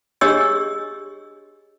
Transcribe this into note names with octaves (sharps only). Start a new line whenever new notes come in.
D4 G4 G#4 C#5 D#5 E6